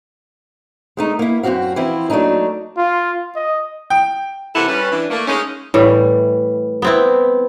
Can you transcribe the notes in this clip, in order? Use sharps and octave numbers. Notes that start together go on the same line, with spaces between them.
G#3 A3 D#4
A#3 E4
F#2 C3 C4 F#4 F5
E3 F3 C4 E4 F4
F#3 A3 A#3 D4 D#4
F4
D#5
G5
C3 E3 A#3 E4 A4 F#5
G3 C#4 B4
E3 D4
A3 A#3
G#3 C#4 D#4
A2 E3 G3
B3 C4 E4